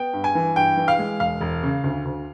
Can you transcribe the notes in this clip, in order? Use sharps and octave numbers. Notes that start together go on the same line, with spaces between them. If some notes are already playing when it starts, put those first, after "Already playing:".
Already playing: B3 G5
G2
G#5
E3
G2 G5
E3
F5
G#3
E1 F5
E1
C#3
D2
D2